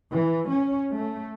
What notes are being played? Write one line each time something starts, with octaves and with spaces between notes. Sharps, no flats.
E3
C#4
A3